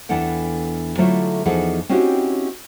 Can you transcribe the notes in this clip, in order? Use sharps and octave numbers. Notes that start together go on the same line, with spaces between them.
E2 E3 D4 A4 F#5 G5
D3 F#3 A3 E4 F4
E2 F3 D#4 G#4 A4 F#5
C4 C#4 D#4 E4 F#4 G4